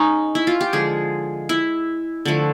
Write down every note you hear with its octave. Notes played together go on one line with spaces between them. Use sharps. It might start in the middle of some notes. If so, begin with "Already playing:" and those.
Already playing: G#3 C#4 D#4
E4
F4
G4
D3 F3 G#3 G#4
E4
D3 F3 A3